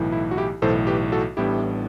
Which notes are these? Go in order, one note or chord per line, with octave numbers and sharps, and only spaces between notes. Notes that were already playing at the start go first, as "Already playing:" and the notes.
Already playing: B1 A2 E3
E4
F#4
E4 G4
B1 A2 E3 A4 C5
G4 B4
F#4 A4
A1 A2 G3 B3 D4 E4 G4